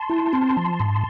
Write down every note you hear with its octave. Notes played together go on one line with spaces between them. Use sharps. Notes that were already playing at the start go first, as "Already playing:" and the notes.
Already playing: A5 C6
E4
C4
F3
G#2